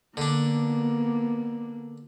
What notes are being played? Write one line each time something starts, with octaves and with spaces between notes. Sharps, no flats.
D3 A#3 B3 D4